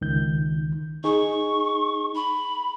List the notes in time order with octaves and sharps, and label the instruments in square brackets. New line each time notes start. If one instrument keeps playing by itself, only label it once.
[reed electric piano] C#2 D#3 G6
[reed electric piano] D#4 G#4 [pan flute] C#6
[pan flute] B5